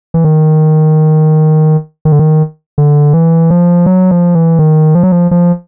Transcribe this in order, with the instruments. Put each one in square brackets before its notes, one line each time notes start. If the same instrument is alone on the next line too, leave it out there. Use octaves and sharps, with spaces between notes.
[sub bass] E3
D#3
D#3
D3
D#3
D3
E3
F3
F#3
F3
E3
D#3
F3
F#3
F3
F3